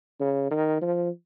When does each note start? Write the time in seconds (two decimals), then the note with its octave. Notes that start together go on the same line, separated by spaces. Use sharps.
0.20 C#3
0.51 D#3
0.81 F3